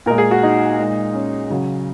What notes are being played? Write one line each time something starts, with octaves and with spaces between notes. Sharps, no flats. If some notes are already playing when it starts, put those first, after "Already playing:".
A#2 G#3 A#4
G#4
F#4
D#4
A#2 G#3
C#4
C#3 F#3